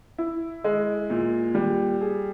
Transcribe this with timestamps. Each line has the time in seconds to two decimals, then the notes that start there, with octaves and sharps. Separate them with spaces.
0.18 E4
0.64 G#3
1.10 A#2
1.55 G3
2.01 G#4